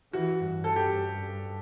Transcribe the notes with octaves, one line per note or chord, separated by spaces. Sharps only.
E3 F#4
G2
A4
G4